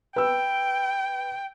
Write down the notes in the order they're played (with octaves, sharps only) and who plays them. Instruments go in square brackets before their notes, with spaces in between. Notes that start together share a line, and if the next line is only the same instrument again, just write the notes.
[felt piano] B4 E6 [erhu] G5